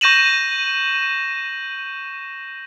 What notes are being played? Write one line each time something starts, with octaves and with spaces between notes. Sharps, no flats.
C#6 G6 A#6 D#7 E7 F#7